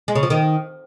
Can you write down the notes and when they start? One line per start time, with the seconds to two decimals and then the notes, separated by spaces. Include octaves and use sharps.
0.08 G#3
0.15 C#3
0.23 F3
0.30 D#3